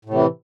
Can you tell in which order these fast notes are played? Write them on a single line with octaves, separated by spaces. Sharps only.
A2 C3 E3